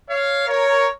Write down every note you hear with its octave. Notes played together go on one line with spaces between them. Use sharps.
C#5 F5
A#4 C#5